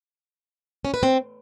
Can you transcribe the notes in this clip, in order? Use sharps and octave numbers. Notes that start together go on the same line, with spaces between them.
C#4
B4
C4